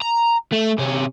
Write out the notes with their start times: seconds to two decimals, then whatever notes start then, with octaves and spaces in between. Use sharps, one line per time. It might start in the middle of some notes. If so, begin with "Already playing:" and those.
0.02 A#5
0.52 A3
0.78 C3 C#4